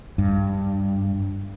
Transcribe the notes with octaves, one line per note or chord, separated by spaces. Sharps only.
G2